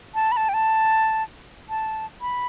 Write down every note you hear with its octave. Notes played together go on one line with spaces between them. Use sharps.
A5
B5
A5
G5
A5
A5
B5